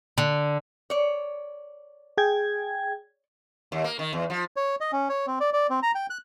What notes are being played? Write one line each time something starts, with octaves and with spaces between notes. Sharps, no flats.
D3
C#5 D5
G#4 G5 G#6
D#2
A#3
D#3
E2
F3
C#5
D#5
C#4
C#5
C4
D5
D5
C4
A#5
G5
F#6